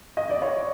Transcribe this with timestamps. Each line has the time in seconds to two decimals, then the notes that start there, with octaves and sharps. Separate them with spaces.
0.17 D#5
0.30 D5
0.42 C#5